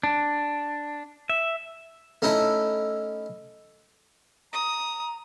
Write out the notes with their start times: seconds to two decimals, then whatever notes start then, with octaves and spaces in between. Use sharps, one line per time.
0.03 D4
1.29 E5
2.22 A3 C#4 D#4 E4 A4
4.53 A#5 D#6